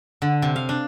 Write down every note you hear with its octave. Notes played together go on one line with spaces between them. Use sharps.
D3
C3
F5
D4